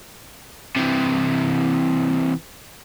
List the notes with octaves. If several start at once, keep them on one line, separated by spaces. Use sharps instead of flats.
C3 E3